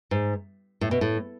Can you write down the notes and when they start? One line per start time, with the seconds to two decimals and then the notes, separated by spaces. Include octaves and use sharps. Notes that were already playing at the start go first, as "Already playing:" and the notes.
0.11 G#2
0.81 A2
0.91 B2
1.01 A2